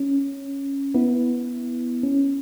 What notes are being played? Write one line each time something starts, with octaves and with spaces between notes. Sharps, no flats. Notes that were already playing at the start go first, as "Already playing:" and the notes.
Already playing: C#4
B3 E4
C#4